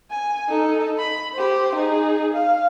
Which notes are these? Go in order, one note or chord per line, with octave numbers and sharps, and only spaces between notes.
G#5
D#4 A4
B5
G4 C5
D#4 G#4
F5